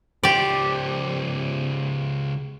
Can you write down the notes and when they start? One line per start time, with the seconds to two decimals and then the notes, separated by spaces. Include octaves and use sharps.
0.23 C#2 G4 C5 D5